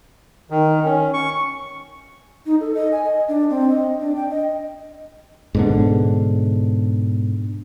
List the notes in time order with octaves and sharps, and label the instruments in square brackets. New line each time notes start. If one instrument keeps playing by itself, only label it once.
[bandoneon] D#3
C#4
C#6
[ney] D#4
A4
D#5
G#5
D#5
D4
C4
D#5
D4
G5
D#5
[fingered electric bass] G#2 B2 D3